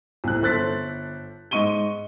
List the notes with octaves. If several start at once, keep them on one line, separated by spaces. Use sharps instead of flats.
C2 A2 C3 F#6
G1 A4 C5 F#6 A6 B6
G#2 D#5 C#6 D#7 G7